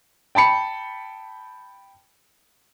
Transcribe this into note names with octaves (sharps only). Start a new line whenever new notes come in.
G5 A5 B5 C#7